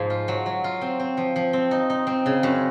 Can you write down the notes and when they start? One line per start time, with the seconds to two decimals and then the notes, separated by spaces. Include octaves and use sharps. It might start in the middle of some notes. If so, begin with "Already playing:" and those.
Already playing: G#2 F3
0.10 F4
0.28 F#3
0.46 F#3
0.64 F4
0.82 C4
1.00 C4
1.17 F3
1.36 F3
1.53 C4
1.71 D#4
1.90 D#4
2.07 C4
2.26 C#3
2.43 F#2